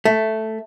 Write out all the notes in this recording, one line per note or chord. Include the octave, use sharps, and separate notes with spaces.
A3